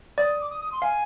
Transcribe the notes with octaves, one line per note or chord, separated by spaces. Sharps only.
D5 D#6
D6
D#6
D#6
C6
F5 G#5